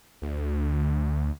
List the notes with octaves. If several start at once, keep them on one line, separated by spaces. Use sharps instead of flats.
D2